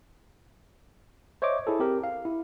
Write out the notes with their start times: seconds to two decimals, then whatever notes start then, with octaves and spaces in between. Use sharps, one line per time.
1.42 C5 C#5 D#5 E5 D6
1.67 E4 G#4 A4
1.80 C4 G4 A#4
2.04 F5
2.25 E4